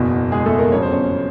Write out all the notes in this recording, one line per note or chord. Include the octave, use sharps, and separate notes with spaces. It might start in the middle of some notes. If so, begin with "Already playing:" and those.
Already playing: F#1 E2 B2
G#3 G#4
A3 A4
A#3 A#4
G1 F2 C#3 F#3 C#5
C5
C#4 C#5